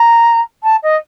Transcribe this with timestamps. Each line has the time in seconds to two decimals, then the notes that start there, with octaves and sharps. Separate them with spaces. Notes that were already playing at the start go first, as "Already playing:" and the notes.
Already playing: A#5
0.63 A5
0.82 D#5